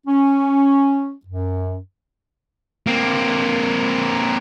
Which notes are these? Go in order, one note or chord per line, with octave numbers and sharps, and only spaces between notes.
C#4
F#2
A#3 C4